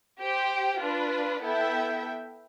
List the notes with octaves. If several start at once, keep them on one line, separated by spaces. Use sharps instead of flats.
G4 C5 G5
D4 F4 B4
B3 E4 A4 E5 G5